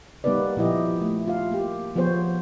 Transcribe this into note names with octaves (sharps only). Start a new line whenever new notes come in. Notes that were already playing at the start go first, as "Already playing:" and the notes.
G3 A#3 B3 D#4 B4 D5
A#2 F3 E4 G4 D#5
A3
F4 F5
A#3 G4
F3 B3 F4 G#4 C5 C#5